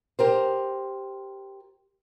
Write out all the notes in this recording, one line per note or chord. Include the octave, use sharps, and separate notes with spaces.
G4 A#4 C5